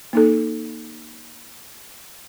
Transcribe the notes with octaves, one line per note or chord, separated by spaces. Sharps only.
A#3 D#4 A4